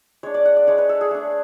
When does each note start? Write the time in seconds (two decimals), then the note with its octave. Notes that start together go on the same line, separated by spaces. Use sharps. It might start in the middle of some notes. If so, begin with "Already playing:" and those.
0.23 G#3 D4 C#5
0.34 D5
0.45 F#5
0.57 D5
0.67 G#3 D4 C#5
0.78 B4
0.89 A4
1.01 G#4
1.11 A3 D4